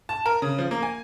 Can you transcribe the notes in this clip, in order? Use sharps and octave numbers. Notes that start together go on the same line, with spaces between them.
A5
A#4
C#3
F3
A#3
G#5